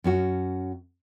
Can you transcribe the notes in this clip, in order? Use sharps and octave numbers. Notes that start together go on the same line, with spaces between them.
F#2 C#4 F#4